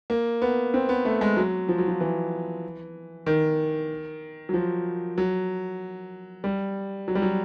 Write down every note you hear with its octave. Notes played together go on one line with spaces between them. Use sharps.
A#3
B3
C4
B3
A3
G#3
F#3
F3
F#3
F3
E3
D#3
F#3
F3
F#3
G3
F#3
G3
F#3